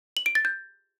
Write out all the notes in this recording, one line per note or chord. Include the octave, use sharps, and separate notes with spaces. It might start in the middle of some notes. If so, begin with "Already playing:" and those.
F#7
D7
A6
G6